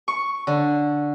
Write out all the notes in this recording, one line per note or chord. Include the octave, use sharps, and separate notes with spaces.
C#6
D3